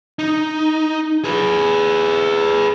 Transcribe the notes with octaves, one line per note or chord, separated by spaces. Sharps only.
D#4
G#4 B4